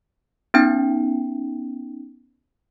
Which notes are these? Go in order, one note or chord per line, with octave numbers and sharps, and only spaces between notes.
B3 C#4 D#4 G5